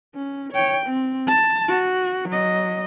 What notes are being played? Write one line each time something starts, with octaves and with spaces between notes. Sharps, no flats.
C#4
C#5 G5
C4
A5
F#4
F#3 D#5